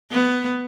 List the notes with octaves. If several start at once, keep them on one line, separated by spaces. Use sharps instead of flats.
B3